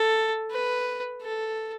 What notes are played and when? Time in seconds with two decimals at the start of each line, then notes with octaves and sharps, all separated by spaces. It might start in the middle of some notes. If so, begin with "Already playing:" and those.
Already playing: A4
0.52 B4
1.22 A4